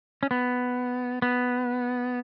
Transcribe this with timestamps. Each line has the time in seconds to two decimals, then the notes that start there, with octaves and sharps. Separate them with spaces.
0.23 C#4
0.31 B3
1.22 B3